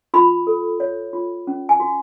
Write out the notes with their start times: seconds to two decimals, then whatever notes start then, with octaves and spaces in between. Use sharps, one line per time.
0.14 F4 B5
0.47 A4
0.80 C#5
1.13 F4
1.47 C#4
1.69 G#5
1.80 F#4